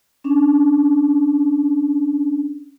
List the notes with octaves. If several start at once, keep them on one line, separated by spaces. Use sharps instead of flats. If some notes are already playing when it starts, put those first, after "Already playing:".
C#4 D4